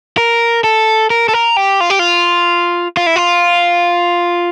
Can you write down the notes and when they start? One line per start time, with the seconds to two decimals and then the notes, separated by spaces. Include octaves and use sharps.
0.18 A#4
0.64 A4
1.10 A#4
1.29 A4
1.34 A#4
1.57 G4
1.80 F4
1.90 G4
1.99 F4
2.97 F4
3.06 E4
3.16 F4